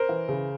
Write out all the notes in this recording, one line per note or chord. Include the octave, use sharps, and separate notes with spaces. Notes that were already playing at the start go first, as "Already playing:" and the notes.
Already playing: A#4 C5
E3
C#3